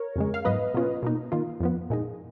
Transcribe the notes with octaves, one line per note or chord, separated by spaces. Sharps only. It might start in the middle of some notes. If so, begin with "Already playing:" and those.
Already playing: A#4 C#5
F2 C#3 G#3
F5
G#2 F#3 B3 B4 D#5
B2 A#3 C#4 F4
B2 A#3 D#4
D#3 A#3 F4
F2 F3 B3
A#2 G#3 D#4